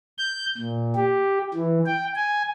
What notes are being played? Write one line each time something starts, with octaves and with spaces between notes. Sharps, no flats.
G6
A#2
G4
E3
G5
G#5